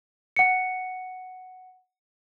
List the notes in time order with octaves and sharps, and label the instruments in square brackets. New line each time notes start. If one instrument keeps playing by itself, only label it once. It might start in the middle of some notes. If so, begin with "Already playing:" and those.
[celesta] F#5 C#7